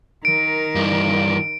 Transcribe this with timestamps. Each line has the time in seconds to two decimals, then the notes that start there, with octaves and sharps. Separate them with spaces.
0.25 D#3 A#4 D7
0.75 G2 E3